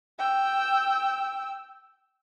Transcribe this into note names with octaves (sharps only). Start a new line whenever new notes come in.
G5 E6